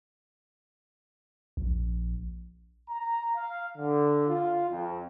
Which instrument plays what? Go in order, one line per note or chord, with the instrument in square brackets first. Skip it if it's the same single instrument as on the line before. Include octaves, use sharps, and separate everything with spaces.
[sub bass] A#1
[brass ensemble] A#5
F5
D3
F4
F2